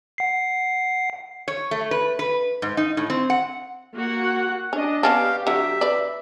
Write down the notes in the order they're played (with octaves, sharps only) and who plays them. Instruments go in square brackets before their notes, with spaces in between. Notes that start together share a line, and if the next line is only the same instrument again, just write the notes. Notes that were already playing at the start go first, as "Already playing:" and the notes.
[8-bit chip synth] F#5 C7
[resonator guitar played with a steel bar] C#5
A3
B4
B4
G#2
D#4
A2
C4
F#5
[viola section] A#3 F#4 F#5
[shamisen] C#4 [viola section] D4 D#5
[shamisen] B3 C#4 D4 [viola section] G4 [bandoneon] F5
[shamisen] D3 F#3 [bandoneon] E5
[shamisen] B4 D5